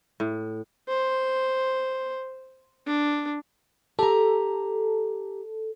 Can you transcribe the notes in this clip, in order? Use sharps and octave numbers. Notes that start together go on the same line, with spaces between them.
A2
C5
D4
G4 A4 A#5